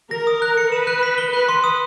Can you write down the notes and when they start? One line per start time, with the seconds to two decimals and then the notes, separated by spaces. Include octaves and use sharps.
0.11 A#4 A#6
0.27 D#6
0.42 F#6
0.58 C#7
0.72 B4 E7
0.87 F#6
1.03 B6
1.18 G7
1.33 B4 F#6
1.49 C6
1.64 D#6